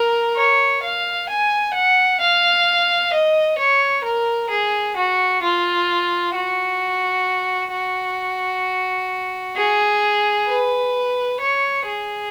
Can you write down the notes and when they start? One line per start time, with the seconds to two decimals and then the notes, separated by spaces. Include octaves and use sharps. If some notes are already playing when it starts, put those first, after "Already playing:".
Already playing: A#4
0.36 C#5
0.83 F5
1.29 G#5
1.74 F#5
2.20 F5
3.13 D#5
3.58 C#5
4.04 A#4
4.50 G#4
4.96 F#4
5.42 F4
6.35 F#4
7.72 F#4
9.56 G#4
10.48 B4
11.40 C#5
11.86 G#4